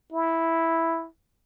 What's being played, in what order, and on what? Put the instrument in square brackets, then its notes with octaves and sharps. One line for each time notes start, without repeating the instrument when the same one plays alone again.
[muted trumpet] E4